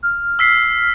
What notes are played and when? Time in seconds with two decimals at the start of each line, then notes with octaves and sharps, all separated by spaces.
0.03 F6
0.39 E6 B6 C7